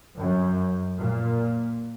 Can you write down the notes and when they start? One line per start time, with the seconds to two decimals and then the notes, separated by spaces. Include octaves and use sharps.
0.19 F#2
0.98 A#2